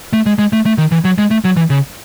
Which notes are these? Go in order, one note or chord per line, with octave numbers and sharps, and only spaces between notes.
A3
G#3
G#3
A3
A3
D#3
E3
F#3
G#3
A3
F#3
E3
C#3